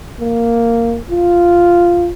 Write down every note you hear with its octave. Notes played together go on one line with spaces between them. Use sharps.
A#3
F4